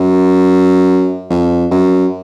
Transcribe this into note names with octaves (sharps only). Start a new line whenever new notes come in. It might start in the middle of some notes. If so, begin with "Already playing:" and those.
Already playing: F#2
F2
F#2